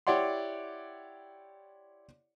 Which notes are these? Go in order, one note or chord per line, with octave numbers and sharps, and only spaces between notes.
E4 G4 C#5 D5 F#5 C6